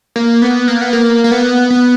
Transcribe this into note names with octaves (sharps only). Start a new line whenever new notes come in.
A#3
B3
A#3
B3
A#3
A#3
B3
B3